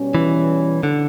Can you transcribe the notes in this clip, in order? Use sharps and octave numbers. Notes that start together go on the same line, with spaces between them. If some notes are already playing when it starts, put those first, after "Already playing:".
Already playing: B2 G3 C#4
E3
D3